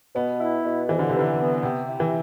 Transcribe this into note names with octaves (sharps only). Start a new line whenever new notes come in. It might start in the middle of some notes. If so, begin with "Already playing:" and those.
B2 B3
E4
B2
F2 E3
D3
C3
D3 E3
B3
C3 G4
E4
E3